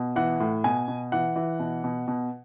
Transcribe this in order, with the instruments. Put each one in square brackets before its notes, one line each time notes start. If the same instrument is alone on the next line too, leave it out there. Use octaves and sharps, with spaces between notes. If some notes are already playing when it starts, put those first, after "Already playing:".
Already playing: [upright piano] B2
E3 F#5
A2
B2 G#5
B2
E3 F#5
E3
B2
B2
B2